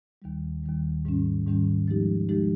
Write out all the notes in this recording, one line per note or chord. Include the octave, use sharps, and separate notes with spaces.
D#2 D#3 G3
D#2 D#3 G3
G#2 D#3 G3 C#4
G#2 D#3 G3 C#4
F3 G#3 D#4 G4
F3 G#3 D#4 G4